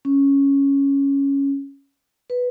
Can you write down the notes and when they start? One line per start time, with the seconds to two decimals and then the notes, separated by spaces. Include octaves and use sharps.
0.05 C#4
2.30 B4